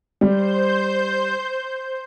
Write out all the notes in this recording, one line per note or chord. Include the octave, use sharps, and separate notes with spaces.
G3 C5 G6